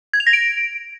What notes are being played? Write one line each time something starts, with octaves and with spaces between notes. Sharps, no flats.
G#6
F7
A#6
D7